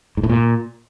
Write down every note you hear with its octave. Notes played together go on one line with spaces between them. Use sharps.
G#2
A2
A#2